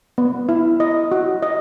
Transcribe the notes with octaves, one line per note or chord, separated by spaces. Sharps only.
B3
E4
D#5
F#4
D#5